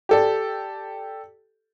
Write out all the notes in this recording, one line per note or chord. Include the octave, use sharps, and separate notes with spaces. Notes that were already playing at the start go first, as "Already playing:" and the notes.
G4 A4 D5